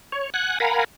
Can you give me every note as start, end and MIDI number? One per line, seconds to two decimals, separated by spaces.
0.12 0.30 73
0.34 0.58 78
0.34 0.58 80
0.34 0.58 90
0.60 0.84 70
0.60 0.84 77
0.60 0.84 78
0.60 0.84 80
0.60 0.84 82
0.60 0.84 83